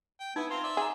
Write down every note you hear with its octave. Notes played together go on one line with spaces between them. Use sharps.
G5
B3 D#4 E4
C4 F4 A#5 C6
D5 E5
G#4 F#5 A#5